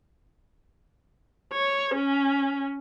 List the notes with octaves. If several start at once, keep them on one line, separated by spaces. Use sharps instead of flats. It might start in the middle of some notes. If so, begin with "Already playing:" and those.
C#5
C#4